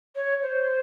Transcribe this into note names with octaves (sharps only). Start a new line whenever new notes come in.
C#5
C5